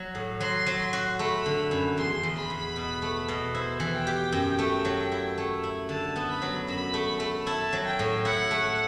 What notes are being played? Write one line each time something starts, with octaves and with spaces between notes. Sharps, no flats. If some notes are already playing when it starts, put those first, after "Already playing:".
Already playing: F#3 F#4
A2
F#3 C6
F#3
F#4
A3 B5
D3
F#2
E2 C6
E2
B5
E2
B2
A3
B2
E4 C5
E3
G5
G4
F#2
A3
F#3
E4
A3
E4
D3 A5
B3
B5
F#3
F#2 B5
A3
A3
E4 A5
F#3
G5
A2
E4 F#5
A3